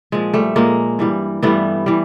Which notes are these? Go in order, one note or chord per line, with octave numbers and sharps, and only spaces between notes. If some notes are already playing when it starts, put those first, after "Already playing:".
A#2 F3 G#3
G3 A3
A#2 F3 G#3 A#3
G2 E3 G3
G2 E3 G3 A3 B3
E3 G3